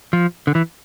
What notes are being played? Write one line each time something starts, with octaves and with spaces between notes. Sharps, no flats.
F3
D3
E3